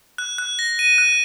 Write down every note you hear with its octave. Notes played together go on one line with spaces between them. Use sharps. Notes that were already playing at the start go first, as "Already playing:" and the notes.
F#6
F#6
A#6
D#7
F#6